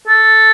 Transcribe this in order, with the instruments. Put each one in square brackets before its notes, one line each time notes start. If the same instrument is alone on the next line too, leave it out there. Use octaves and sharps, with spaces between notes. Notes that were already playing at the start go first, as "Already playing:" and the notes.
[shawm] A4